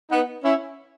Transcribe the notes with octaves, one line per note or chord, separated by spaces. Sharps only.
B3 D#4
C#4 E4